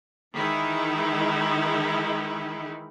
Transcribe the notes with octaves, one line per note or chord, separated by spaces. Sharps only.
D#3 E3 G#3 D#4 E4